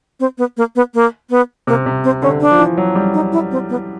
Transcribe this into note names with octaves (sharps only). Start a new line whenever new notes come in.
C4
B3
A#3
B3
A#3
B3
C3 A#3
C3
C4
D3 C#4
D4
F3
E3
F#3
G3
D#4
E4
C4
B3